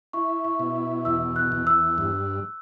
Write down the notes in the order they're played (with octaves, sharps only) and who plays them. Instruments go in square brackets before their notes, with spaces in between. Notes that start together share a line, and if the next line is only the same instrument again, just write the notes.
[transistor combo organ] E4 [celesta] C#6
[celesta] C#6
[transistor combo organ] B2
[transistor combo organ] E2 [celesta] E6
[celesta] F#6
[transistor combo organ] E2
[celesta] E6
[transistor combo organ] G2